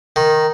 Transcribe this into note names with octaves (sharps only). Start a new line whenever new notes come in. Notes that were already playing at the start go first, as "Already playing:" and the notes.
D#3